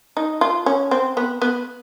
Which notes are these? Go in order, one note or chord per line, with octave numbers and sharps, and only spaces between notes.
D#4
F4
C#4
C4
B3
B3